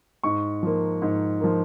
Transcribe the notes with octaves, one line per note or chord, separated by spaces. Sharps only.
G#2 C#6
F3 A#3
G#2
F3 A#3